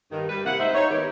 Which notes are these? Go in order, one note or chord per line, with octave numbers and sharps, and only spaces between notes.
G2 D#3
G3 B4
C3 A#3 E4 F#5
G#2 D#4 C5 E5
D#4 C#5
D#3 B3 G4